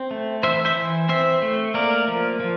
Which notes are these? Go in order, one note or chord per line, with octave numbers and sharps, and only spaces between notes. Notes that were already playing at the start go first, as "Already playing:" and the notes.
Already playing: C4
A3
E3 C5 E5
C5 E5
E3
C4 C5 E5
A3
A#3 A#4 D5
F3
F3